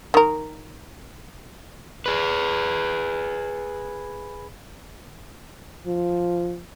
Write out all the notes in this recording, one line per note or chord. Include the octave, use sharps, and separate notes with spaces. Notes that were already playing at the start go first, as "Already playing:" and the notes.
D#3 A#4
G#4 B4
F3